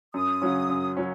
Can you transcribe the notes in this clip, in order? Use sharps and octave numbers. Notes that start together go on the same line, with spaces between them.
F#2 D#6
C#3 F#3 C#4
F#2
F#3 C#4